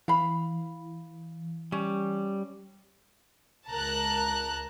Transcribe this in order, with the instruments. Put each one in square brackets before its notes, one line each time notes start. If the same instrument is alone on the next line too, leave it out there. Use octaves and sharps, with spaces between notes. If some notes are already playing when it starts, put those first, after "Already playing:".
[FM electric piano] E3 [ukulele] F5 B5
[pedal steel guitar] G3 [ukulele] C#4
[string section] C#2 A#4 A5 A#5 F#6